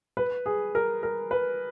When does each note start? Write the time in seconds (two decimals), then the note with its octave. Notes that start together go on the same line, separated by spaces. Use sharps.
0.17 B4
0.46 G#4
0.75 A#4
1.03 A#4
1.31 B4